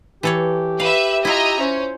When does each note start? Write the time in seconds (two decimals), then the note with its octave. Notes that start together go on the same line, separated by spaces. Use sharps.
0.23 E3 G4 A4 C#5
0.80 B4 E5 F5
1.25 E4 F4 D#5 E5 A#5
1.60 C#4 C5